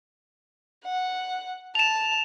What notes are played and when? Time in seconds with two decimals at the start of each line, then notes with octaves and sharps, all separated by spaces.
0.85 F#5
1.75 A5 E7 F7